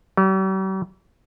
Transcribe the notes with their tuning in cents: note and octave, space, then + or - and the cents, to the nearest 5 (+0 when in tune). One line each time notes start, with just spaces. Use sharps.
G3 -45